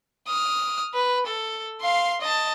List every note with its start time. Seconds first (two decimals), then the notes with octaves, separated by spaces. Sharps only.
0.28 D#6 F6
0.94 B4
1.26 A4
1.81 F5 C6
2.21 D#5 A5